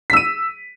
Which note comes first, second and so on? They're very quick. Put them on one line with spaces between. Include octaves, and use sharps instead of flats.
B6 E6 D#7